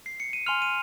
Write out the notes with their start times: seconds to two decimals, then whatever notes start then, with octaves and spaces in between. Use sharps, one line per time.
0.06 C7
0.20 C#7
0.33 D#7
0.46 G#5 C6 F6 F7
0.62 D#7